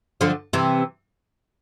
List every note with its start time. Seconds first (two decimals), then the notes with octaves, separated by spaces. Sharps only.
0.21 D3 F3
0.53 C3 E3